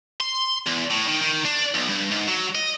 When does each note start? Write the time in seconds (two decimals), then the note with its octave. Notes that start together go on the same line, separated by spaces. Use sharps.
0.20 C6
0.66 E2
0.90 A2
1.07 D#3
1.21 D#3
1.45 D4
1.75 B1
1.89 G2
2.12 G#2
2.28 F#3
2.55 D#5